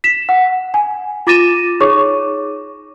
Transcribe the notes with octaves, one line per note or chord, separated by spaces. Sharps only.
B6 E7
F#5
G#5
F4 D6 A6 A#6 D#7 E7
D#4 G#4 C#5 C#6 D6